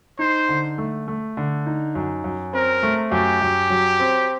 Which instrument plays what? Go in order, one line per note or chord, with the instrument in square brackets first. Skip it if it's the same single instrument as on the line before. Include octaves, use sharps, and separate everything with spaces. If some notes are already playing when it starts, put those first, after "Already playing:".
[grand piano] D#4 [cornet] C5
[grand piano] D3
A3
A3
D3
D#4
F#2
F#2
[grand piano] C4 [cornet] A#4
[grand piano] A3
[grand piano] F#2 [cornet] G4
[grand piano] F#2
F#3
C4